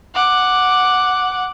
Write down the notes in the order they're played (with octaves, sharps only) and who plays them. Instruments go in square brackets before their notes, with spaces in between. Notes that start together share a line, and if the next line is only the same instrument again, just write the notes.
[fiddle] F#5 D6